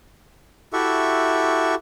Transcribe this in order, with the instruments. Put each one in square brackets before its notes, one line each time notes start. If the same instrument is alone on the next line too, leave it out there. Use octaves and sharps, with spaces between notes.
[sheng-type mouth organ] E4 F#4 G4 A4 E5 C#6